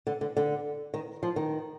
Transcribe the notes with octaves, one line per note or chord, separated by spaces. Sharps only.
D3
D3
D3
D#3
F3
D#3